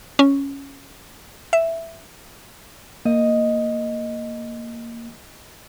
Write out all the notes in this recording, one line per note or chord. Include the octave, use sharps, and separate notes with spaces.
C#4
E5
A#3 D#5